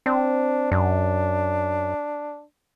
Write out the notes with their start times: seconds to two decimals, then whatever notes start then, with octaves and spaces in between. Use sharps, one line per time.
0.06 C4 D4
0.72 F#2 D4